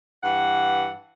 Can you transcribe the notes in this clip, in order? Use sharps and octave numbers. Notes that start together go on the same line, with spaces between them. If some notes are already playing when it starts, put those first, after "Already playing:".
G2 E3 F#5